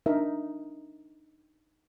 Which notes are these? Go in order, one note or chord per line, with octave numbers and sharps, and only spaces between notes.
D4 D#4 A#4 E5